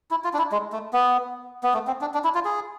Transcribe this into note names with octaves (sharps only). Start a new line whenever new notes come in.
E4
F4
D4
E4
G#3
A3
B3
B3
A3
C4
D4
D4
E4
F4
G#4